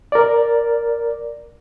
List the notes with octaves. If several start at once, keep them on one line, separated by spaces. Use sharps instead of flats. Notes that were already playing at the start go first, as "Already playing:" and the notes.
A#4 D5